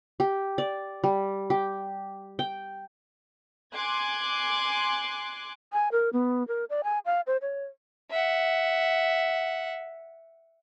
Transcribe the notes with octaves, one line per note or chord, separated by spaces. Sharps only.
G4
D5
G3
G4
G5
G#5 C6 D6 F#6 G#6
G#5
A#4
B3
A#4
D5
G#5
F5
C5
C#5
E5 F#5